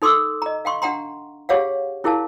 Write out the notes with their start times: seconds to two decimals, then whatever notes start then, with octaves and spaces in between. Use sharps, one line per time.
0.02 D#4 A4 C6 D6 E6
0.42 D#5 A#5
0.65 F5 G5 C6 C#6
0.82 D4 F#5 G5 A#5 C6
1.49 G4 G#4 C#5 F5 F#5
2.04 C#4 E4 G#4 A#4 F5 A5